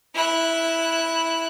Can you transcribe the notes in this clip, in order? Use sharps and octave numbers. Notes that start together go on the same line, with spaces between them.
E4 F#6